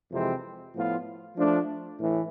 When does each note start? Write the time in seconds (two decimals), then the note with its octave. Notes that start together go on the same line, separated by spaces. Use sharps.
0.11 F2 C3 E3 G#3 C4
0.74 A2 F3 B3 F4
1.36 F3 A3 D4
1.99 A2 E3